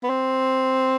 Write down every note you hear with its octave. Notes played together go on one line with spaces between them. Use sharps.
B3
C4